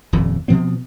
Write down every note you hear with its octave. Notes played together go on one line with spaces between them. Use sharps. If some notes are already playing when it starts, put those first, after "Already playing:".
D#1 F2 A#2
B2 F3 B3 C4